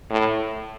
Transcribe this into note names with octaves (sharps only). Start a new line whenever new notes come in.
A2